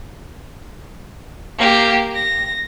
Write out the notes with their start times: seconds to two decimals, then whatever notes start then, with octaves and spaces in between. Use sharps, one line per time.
1.58 A#3 G4
2.16 A#6